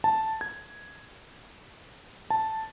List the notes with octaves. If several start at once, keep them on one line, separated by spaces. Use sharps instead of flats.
A5
G#6
A5